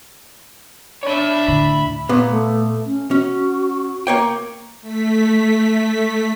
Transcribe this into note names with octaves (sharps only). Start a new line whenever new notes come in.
D4 C#5 E5 B5
D2 A2 B5
A#2 B3
A3
C#4
C#4 F#4
A#3 C#5 G5
A3 B6